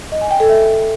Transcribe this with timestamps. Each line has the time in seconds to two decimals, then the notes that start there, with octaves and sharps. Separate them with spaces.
0.12 D#5
0.21 G#5
0.31 G5
0.40 A4
0.49 E5